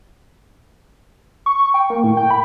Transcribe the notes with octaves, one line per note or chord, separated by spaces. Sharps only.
C#6
G5
A#3
A2
G5
B5